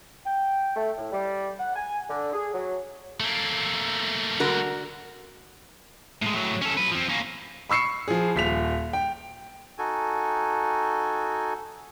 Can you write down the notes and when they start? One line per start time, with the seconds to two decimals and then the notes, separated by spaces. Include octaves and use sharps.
0.26 G5
0.75 A3
0.98 A2
1.13 G3
1.58 F#5
1.76 G#5
2.09 D3
2.33 G#4
2.53 F#3
3.20 A3 A#3
4.40 D3 F#4 A#4
6.22 A2 G#3
6.34 A2 F#3
6.62 C#4 A4
6.77 F#3 B4
6.91 F3 C4
7.09 A#3 C#4
7.70 B5 C#6 E6 C7 C#7
8.08 F3 G#4
8.36 D#1 B6 F7
8.93 G5
9.78 D#4 F#4 A4 G#5